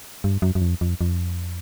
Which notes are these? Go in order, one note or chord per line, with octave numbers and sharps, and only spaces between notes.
G2
F#2
F#2
F2
F2
F2